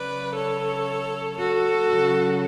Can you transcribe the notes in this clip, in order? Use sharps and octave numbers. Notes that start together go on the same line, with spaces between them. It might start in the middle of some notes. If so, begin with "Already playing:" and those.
Already playing: C#3 F#3 B4 D5
A4 C#5
F#4 A4
C#3 F#3